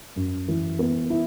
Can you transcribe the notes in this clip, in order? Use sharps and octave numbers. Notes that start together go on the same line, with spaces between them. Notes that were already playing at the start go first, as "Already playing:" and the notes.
F#2
E3
B3
E4